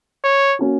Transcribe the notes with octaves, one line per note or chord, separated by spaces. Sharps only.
C#5
A#3 C#4 F#4